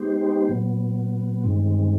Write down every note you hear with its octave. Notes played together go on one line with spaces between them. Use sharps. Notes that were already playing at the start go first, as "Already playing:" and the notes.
Already playing: G#3 B3 D#4 G4 C5
A#2 F#3 B3
G2 D#3 G#3 C4